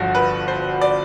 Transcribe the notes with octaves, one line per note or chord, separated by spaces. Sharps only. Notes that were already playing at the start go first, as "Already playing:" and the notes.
Already playing: G1 G2 D3 F3 F#4
B4
C5
D5